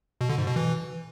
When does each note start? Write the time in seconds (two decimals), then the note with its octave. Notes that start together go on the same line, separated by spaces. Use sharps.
0.21 B2
0.29 D3
0.38 G#2
0.47 B2
0.56 E3